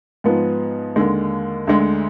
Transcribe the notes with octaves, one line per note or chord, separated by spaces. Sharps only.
G#2 F3 B3
D#2 D3 G#3
D2 D3 G#3